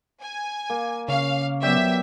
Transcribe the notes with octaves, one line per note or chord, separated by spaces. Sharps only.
G#5
A#3
C#3 C#4 F5
F#3 B3 G4 D5 E5 G5